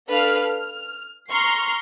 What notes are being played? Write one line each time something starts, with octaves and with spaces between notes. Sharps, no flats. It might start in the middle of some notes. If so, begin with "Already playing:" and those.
D4 A4 B4 F5 F6
F6
A#5 C6 C#6 F6 C7